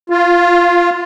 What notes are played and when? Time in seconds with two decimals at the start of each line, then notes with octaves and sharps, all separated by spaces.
0.10 F4